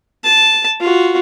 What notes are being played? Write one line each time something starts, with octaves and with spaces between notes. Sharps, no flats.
A5
F4 F#4